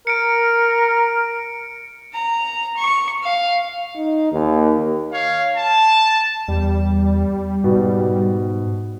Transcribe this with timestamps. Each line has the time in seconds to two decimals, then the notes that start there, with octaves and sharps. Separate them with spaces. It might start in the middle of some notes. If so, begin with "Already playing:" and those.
0.07 A#4 C#7 D7
2.13 A#5
2.76 C#6
3.23 F5
3.96 D#4
4.32 D#2
5.12 C#5 F5
5.57 A5
6.48 E2 G3
7.64 G#2 B2